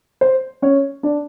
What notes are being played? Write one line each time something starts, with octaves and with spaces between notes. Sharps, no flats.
C5
C#4 C#5
D4 D5